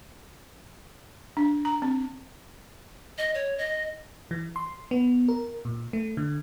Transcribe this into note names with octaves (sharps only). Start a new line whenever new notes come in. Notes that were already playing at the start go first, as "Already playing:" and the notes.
D4
A#5
C4
D#5
C#5
D#5
E3
C6
B3
A#4
A#2
A3
D3